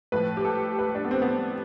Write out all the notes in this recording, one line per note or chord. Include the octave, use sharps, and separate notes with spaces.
A2 F3 B4
G4
A4
B4
D4
B3
C4
B3
C4